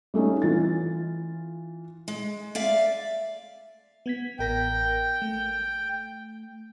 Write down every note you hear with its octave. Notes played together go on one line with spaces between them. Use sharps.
G3 A3 C#4 D#4
E3 F4 A6
G#3
D5 E5 F5
B3 G#6 B6
A1 A#4 G5 A#6
A3